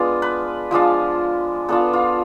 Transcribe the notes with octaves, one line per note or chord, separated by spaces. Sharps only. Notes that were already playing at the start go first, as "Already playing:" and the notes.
Already playing: G#3 B3 D4 F4
B4
F3 G#3 D4 F4
B3 D4 F4 A4
F4